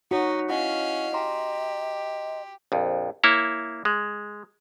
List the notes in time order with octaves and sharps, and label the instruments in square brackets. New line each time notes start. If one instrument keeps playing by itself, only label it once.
[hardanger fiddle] D#4 [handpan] F#4 [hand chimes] C#5 B6 C#7
[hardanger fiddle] C#4 F5 [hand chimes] E4 F#5 B6 [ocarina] D#5
[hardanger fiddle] G4 [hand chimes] A#5 C6
[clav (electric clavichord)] A#1 F2
A#3 E4 C#5
G#3